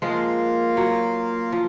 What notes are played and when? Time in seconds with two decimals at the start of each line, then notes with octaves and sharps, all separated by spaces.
0.02 F3 G#3 A#3 F4 A#4 F5
0.77 F#3
1.52 F3